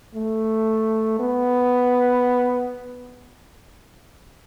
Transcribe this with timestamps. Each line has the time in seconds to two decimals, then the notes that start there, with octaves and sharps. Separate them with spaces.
0.15 A3
1.19 B3